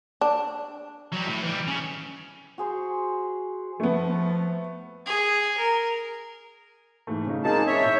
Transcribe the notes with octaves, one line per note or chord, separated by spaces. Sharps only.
D4
F#3 G3
A2
E3 G3
C#3
F#4 G#4 C5
F3 A3 B3
G#4
A#4
G#2 E3 A3
C#3 D#4
G#3 A#3 C4 D#4 G#4 A5
C#5 E5
A2 G6